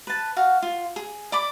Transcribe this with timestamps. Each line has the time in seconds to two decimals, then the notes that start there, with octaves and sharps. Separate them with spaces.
0.07 B4 A5
0.36 F#4 F5
0.62 F4
0.96 G#4
1.32 D5 B5 D6